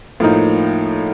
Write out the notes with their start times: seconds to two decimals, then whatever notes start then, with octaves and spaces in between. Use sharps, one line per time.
0.20 A2 F3 A#3 D#4